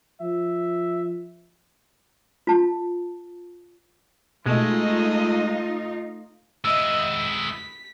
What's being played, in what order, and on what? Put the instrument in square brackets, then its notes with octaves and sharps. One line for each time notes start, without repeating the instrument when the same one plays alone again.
[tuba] F3 [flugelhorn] E5
[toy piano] F4 A5
[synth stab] B2 [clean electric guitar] G#3 [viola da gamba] A3 D#5 [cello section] D#4 F4
[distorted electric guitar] G#3 E4 [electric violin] D#5 E5 [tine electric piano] E6
[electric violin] B6